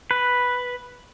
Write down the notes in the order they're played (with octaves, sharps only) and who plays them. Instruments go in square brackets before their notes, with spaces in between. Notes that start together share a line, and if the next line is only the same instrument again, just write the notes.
[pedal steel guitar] B4